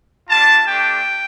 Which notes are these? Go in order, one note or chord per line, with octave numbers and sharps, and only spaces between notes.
G3 D4 F4 A5
A3 D4 G4 G5